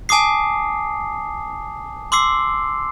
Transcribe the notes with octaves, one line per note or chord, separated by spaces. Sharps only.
G#5 A5 D6 D#6 C7
C6 D6 E6 C7